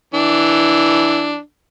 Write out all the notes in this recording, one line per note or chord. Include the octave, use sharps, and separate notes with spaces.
E3 D4